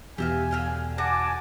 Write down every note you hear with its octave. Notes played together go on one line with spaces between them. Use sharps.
E2 B2 G4 E5 F5 G#5
D3 F5 G5
F#4 F#5 G#5 A5 D6